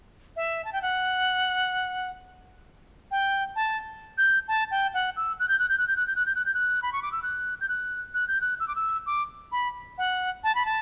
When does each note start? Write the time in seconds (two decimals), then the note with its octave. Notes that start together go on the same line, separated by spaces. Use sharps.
0.36 E5
0.65 A5
0.73 G5
0.82 F#5
3.11 G5
3.56 A5
4.18 G6
4.48 A5
4.71 G5
4.94 F#5
5.17 E6
5.40 F#6
5.49 G6
5.59 F#6
5.69 G6
5.78 F#6
5.88 G6
5.97 F#6
6.07 G6
6.16 F#6
6.26 G6
6.35 F#6
6.46 G6
6.54 F#6
6.82 B5
6.93 C#6
7.02 D6
7.12 E6
7.23 F#6
7.61 G6
7.69 F#6
8.14 F#6
8.28 G6
8.41 F#6
8.60 E6
8.68 D6
8.75 E6
9.06 D6
9.52 B5
9.98 F#5
10.44 A5
10.55 B5
10.66 A5